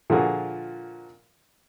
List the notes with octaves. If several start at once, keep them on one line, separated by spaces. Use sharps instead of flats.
A#2 D3 F3 F4 F#4 G#4